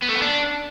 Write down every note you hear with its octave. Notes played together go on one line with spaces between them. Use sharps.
B3
A3
B3
D4